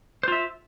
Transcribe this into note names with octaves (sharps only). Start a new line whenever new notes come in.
F4 C5 E5